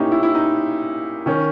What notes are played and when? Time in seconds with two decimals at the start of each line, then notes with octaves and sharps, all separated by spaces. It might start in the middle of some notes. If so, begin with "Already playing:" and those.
Already playing: A#2 C#4 D#4 E4 G4
0.12 E4
0.23 E4
0.35 D#4
1.26 D#3 C#4